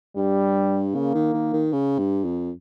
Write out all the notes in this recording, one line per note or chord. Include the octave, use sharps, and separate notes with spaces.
G2 G3
C#3 A#3
D#3
D#3
D#3
C#3
G2
F2